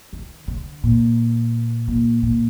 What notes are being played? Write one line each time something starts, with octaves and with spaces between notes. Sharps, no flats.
D#3
D3
A#2
A#2
A#2